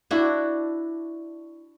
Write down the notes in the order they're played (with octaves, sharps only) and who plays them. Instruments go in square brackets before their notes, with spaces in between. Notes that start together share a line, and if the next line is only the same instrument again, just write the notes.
[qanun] D4 E4 F#4